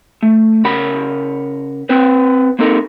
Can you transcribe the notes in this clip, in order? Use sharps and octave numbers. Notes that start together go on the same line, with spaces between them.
A3
C#3 A#4 F#5 B5
C4 B4 C5
A#3 C4 D#4 A4 A#4